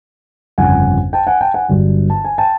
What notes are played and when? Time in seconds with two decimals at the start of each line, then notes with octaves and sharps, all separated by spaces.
0.58 G1 F2 C#3 F#5 G#5
1.13 G5 A5
1.27 F#5 G#5
1.41 G5 A5
1.54 F#5 G#5
1.68 G1 G2 D3 F#3
2.10 A5
2.25 G#5
2.38 G5 A5